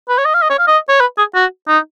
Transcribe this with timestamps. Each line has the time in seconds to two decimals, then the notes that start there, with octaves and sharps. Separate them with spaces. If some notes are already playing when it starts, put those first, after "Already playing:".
0.09 B4
0.18 C#5
0.25 D#5
0.34 F5
0.42 D#5
0.50 C#5
0.59 F5
0.68 D#5
0.89 C#5
1.01 B4
1.18 G#4
1.35 F#4
1.68 D#4